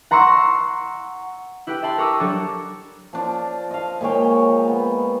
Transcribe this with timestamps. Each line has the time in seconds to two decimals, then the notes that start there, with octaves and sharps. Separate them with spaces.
0.11 F#5 A#5 C6 C#6 E6
1.67 E4 G4 B4 G5 D7
1.82 E5 A5 B5 C6
1.98 A#4 C#6 D6 E6 D#7
2.20 F#3 G3 D4 A4 C#5
3.13 F3 D4 F4
3.71 D#5 F5
4.01 A#2 G#3 C#5 G5
4.68 B3